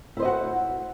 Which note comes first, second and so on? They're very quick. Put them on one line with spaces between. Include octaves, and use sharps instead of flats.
E4 C5 D#5 F#4 F#5